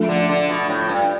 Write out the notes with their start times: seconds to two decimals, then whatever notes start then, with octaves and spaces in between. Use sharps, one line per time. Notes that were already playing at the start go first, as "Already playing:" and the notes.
Already playing: F3 A3 D4 A4 E5
0.09 D3
0.29 D3
0.49 B2
0.69 A2
0.89 G2